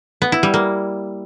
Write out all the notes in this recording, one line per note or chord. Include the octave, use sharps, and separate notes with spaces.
B3
E4
G3
A#3